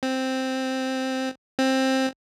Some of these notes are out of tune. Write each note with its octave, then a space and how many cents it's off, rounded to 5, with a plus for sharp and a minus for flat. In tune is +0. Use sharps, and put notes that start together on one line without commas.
C4 +0
C4 +15